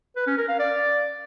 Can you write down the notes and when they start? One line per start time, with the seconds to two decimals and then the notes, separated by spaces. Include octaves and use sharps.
0.16 B4
0.27 C#4
0.38 A#4
0.49 F5
0.59 D5